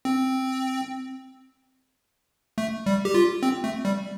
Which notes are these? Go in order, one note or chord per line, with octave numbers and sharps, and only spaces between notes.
C4
A3
G3
G4
F4
C4
A3
G3